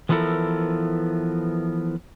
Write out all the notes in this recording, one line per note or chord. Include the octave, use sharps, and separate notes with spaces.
E3 F3 B3 E4 A4 A#4